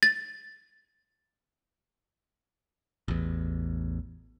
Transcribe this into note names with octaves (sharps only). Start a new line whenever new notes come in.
A6
A1 E2